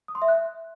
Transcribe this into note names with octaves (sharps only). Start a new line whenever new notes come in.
D#6
C6
E5
F#6